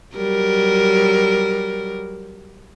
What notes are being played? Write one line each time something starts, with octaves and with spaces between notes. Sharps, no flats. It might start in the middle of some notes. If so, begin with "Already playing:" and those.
F#3 G3 A#4